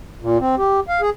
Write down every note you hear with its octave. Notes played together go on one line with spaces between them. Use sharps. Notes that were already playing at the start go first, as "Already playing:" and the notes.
A#2
C4
G4
F5
G#4